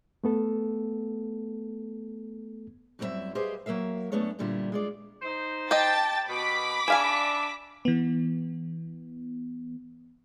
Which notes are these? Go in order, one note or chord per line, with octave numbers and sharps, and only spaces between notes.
A3 B3 A4
F#2 G3 C4 D#4 E4 E5
G4 G#4 B4 C5 D#5 F5
F#3 A#3 A#4 E5 F5
F#2 A3 B3 D4 A4 C#5
G2 A#2 D3 G3 E4 F4
G#3 F4 D5
D#4 C5
G4 D#5 G5 A5 A6
B2 B5 D6 B6
D4 G#4 D5 E5 F5 G#5
E3 B3